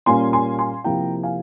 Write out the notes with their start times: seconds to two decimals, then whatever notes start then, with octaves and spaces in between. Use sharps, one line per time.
0.06 A#2 G3 A#3 C#4 G#5 C6
0.33 G#5 C6
0.59 G#5 C6
0.84 C3 F3 A#3 E4 G5 A#5
1.23 F5 G#5